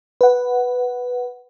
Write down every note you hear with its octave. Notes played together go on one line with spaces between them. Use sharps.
B4 F#5